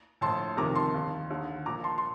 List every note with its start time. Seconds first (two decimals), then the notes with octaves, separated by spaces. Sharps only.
0.21 A#1 A2 A5 C6
0.57 G1 F2 C3 D#3 A#5 D6
0.75 A5 C6
0.94 D#2 D#3
1.30 D#2 D3
1.66 A#1 A#2 A#5 D6
1.84 A5 C6
1.98 C6